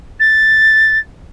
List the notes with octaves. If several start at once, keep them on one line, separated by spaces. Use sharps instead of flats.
A6